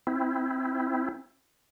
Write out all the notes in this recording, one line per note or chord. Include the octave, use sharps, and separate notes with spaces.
C4 E4